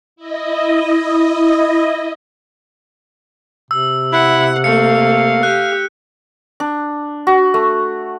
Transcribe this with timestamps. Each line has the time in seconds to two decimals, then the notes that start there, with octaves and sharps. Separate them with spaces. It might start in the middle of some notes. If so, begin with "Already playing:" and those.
0.16 E4 D#5
3.71 C3 E6
4.13 E4 F#5
4.64 A3 A#3 F5 C#7
5.43 G4 F#6
6.60 D4
7.27 F#4
7.54 A3